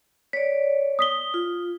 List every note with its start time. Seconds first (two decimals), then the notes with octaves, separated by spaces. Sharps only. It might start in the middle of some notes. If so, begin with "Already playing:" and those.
0.33 C#5 D5 B6
0.99 D#6 B6 G7
1.34 F4